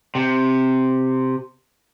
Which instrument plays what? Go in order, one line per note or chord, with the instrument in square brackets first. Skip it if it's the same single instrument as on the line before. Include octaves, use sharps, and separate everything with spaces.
[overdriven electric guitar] C3